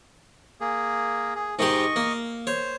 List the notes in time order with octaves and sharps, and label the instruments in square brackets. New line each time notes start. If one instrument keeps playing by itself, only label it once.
[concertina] A#3 G#4
G#4
[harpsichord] G#2 D#3 G4 [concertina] D#5 C#6
[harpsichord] A#3
[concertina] C5 [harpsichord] C#5